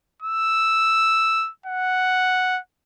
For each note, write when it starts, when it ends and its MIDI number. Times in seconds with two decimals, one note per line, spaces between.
0.22 1.50 88
1.66 2.59 78